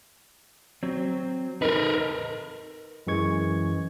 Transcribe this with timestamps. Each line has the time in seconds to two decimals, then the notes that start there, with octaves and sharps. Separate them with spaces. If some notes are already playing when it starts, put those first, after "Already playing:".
0.83 F#3 C4
1.62 D#4 A#4 B4
3.07 F#2 E3 G#3 C#6 G#6